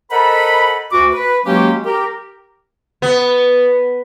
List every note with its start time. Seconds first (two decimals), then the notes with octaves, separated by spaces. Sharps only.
0.11 A4 A#4 C5 D#5 F#5 B5
0.92 D2 F#4 D6
1.13 B4
1.45 F#3 G#3 A#3 C#4 F#4 G4
1.85 G4 A#4
3.02 B3